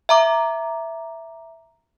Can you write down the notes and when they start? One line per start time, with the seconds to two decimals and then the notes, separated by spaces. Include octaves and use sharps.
0.09 E5 A#5 D6